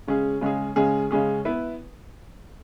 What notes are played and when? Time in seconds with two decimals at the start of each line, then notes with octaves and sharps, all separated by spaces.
0.07 C#3 G#3 C#4 G#4
0.41 C#3 G#3 C#4 G#4
0.76 C#3 G#3 C#4 G#4
1.11 C#3 G#3 C#4 G#4
1.45 B3 E4 B4